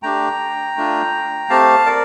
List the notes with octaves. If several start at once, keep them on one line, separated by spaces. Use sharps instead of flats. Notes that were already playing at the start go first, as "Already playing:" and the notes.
A3 D4 G4 G5 A#5
A3 D4 F4
A3 C4 G4 F5 A5
A#4 D5